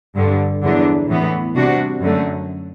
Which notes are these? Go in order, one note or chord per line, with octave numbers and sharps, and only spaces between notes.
G2 D3 G3
E2 D3 F#3 B3 D4
A2 E3 B3
C3 G3 D4 F#4
F#2 D3 F#3 A3